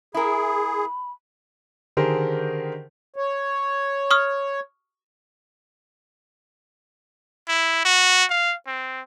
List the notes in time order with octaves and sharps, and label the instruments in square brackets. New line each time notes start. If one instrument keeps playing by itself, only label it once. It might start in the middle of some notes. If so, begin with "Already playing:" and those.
[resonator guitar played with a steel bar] E4 A#4 [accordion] G#4 [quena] B5
[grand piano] D3 D#3 G4 G#4 A#4 C5
[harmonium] C#5
[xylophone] C#6 D#6 F6
[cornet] E4
F#4
F5
C4